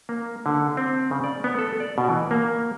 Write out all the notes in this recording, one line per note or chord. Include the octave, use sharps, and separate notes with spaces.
A#3
D3
C4
C#3
D5
B3
A4
D5
B2
E3
A#3